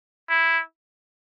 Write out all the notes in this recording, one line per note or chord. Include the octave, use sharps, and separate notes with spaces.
E4